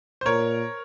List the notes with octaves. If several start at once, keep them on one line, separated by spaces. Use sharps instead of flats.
C5
A#2 A#4 C#5